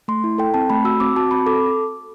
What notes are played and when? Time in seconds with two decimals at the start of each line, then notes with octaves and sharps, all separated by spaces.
0.08 A3 C6
0.24 E4
0.38 A4 G5
0.54 C4 A5
0.70 A3 B5
0.85 F#4 E6
1.00 C4 D6
1.16 F#4 A5
1.31 C4 B5
1.46 A4 D6